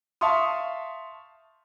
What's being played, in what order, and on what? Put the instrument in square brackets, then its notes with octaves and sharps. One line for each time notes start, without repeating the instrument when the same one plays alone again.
[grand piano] E5 F5 A5 C6 C#6 D#6